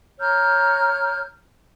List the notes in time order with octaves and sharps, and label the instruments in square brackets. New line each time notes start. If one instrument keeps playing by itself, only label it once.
[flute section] C#5 A#5 F6 G6